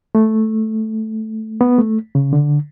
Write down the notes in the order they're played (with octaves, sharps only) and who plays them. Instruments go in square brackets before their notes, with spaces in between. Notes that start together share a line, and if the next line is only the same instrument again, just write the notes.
[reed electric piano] A3
B3
A3
C#3
D3